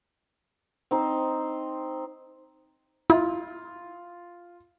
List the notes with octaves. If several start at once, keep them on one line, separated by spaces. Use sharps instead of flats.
C4 D#4 C5
E4 F4